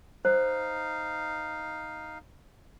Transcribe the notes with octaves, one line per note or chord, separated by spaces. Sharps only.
D#4 C5 F5